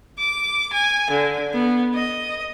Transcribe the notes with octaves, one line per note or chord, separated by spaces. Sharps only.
D6
G#5
D3
B3
D#5